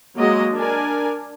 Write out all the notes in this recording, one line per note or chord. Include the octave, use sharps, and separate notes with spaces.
F#3 G#3 A#3 F#4 D#5
D4 A#4 G#5